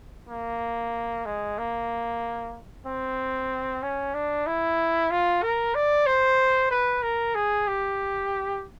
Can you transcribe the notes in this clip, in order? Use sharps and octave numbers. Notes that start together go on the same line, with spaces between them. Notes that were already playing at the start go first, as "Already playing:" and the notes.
A#3
G#3
A#3
C4
C#4
D4
E4
F4
A#4
D5
C5
B4
A#4
G#4
G4